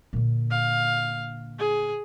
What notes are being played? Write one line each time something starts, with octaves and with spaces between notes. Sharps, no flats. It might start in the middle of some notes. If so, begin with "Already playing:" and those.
A#2 D3
F5
G#4